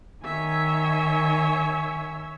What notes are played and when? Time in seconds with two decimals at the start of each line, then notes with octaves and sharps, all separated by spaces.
0.24 D#3 C#5 E5 G#5